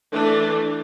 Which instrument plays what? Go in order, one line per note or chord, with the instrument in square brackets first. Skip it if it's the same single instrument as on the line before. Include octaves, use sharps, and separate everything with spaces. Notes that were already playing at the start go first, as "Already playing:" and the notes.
[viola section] E3 A3 D4